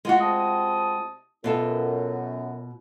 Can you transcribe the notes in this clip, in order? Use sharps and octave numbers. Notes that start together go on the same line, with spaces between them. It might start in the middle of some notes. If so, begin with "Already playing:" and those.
G#3 F4 F#4
C3 A5 D#6
F#2 B2 F4 A4